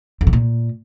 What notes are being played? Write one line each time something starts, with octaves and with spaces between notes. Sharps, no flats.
F2
C3
A#2